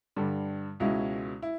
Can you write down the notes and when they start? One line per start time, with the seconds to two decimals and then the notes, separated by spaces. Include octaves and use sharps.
0.16 G2 D3 G3
0.80 C#2 B2 G#3 C#4 E4
1.42 E4